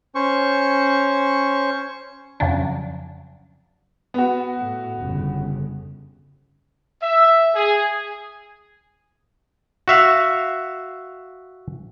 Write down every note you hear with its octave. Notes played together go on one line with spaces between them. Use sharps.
C#4 C5 C#6
F2 C#3 F#3 D4
B3 F#4
A2
G1 F2 C#3
E5
G#4
F#4 E5 F5